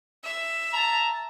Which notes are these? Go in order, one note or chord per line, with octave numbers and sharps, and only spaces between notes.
E5
A5 A#5